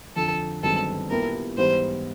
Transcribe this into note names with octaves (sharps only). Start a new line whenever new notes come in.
F2 D3 F3 A4
G1 F#2 D#3 G#3 C4 A4
A#2 G3 B3 E4 G4 A#4
G#2 E3 G3 B3 C5